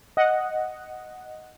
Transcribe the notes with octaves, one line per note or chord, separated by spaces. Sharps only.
D#5 F#5